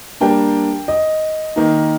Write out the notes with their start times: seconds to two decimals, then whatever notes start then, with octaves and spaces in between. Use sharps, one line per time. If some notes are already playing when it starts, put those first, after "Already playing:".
0.21 G3 A#3 D4 G5
0.88 D#5
1.56 D#3 A#3 D#4